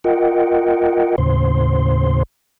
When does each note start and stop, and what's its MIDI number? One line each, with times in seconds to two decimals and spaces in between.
0.04 1.16 65
0.04 1.16 70
0.04 1.16 75
0.04 1.16 78
0.04 1.16 79
1.18 2.23 39
1.18 2.23 45
1.18 2.23 49
1.18 2.23 72
1.18 2.23 84